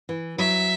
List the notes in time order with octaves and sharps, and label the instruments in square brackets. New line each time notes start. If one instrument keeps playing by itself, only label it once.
[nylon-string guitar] E3
[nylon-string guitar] F#3 [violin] E5